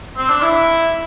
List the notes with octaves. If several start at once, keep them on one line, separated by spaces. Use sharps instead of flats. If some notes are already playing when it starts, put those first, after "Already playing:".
C4
D4
E4